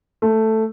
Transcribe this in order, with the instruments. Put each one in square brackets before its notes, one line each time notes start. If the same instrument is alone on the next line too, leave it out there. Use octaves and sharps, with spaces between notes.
[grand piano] A3